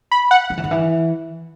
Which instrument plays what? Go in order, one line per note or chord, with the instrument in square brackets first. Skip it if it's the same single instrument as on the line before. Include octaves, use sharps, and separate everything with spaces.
[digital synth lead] B5
F#5
[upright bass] F3
E3
D#3
E3